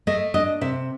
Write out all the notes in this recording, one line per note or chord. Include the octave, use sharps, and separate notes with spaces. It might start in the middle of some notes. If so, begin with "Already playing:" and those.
A3 D#5
D4 D#5
C3 E5